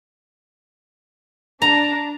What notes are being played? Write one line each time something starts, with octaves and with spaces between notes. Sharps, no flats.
D4 A#5